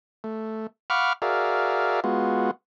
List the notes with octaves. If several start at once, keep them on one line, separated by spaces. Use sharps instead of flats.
A3
F5 F#5 B5 C#6 D6 F6
F#4 G#4 A#4 D5 E5 F5
G#3 B3 F4 F#4